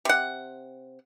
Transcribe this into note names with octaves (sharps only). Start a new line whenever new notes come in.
C3 F#5